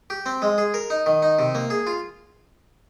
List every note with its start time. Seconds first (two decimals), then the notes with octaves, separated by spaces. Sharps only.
0.10 G4
0.26 C4
0.42 G#3
0.58 G#4
0.74 A#4
0.90 D#4
1.06 D#3
1.22 D#4
1.39 C3
1.55 A#3
1.70 G#4
1.87 F4